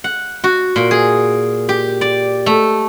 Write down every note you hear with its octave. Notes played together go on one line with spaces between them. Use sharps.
F#5
F#4
A#2
G#4
G4
D5
A3